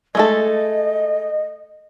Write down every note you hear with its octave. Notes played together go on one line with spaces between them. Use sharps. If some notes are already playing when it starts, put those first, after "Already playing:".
G#3 A3 A4 D#5